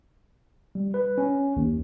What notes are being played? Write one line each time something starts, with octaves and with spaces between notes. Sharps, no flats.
G3
B4
C#4
D#2